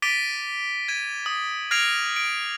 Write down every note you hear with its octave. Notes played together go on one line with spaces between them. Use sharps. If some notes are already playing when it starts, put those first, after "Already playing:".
D6 A6 B6 D7 D#7 G7
G#6 D#7
D#6
F6 G#6 A#6 C7 D7 F7
D7